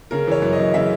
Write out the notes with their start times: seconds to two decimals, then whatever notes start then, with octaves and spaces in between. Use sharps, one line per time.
0.11 C#3 A#4
0.28 E3 C#5
0.42 F#2
0.53 D#5
0.59 F#2
0.74 C#3 E5